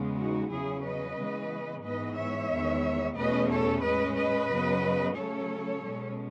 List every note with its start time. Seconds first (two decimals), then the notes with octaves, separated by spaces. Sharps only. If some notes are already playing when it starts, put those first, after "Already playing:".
Already playing: E2 C#3 G#3 B3
0.18 D#4 F#4
0.52 E2 C#3 F#3 C#4 E4 G#4
0.84 B4 D#5
1.18 C#3 E3 G#3 B3
1.84 G#2 E3 B3 B4 D#5
2.18 C#5 E5
2.51 E2 D#3 G#3 B3
3.17 E2 B2 A3 C#4 B4 D#5
3.50 A4 C#5
3.83 A2 G#3 C#4 B4 D#5
4.17 B4 D#5
4.50 F#2 C#3 F#3 B3
5.16 C#3 F#3 A3 C#4 A4 C#5
5.83 B2 G#3 C#4